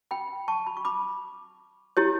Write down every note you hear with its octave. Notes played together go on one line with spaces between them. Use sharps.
G5 B5
A5 C#6
B5
C#6
B5 D6
E4 G4 C#5